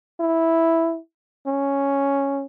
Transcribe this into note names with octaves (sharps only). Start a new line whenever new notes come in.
E4
C#4